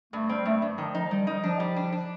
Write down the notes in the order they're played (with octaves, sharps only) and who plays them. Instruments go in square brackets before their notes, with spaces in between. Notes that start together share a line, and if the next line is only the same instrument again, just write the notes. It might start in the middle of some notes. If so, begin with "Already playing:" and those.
[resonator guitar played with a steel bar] G2 [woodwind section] A3
[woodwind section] G3 [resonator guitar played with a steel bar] C4
[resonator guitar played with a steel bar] G2 [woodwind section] A3
[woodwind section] A3
[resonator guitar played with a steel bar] G2
[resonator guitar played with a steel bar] D#3 [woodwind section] F3
[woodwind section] F3 [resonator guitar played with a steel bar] D#4
[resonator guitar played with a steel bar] D#3 [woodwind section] G3
[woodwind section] G3 [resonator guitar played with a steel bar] D#4
[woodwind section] F3 [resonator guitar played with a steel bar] D4
[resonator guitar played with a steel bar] G3
D4
D4